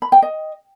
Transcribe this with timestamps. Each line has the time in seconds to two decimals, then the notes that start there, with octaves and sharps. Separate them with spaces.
0.02 B5
0.12 G5
0.22 D#5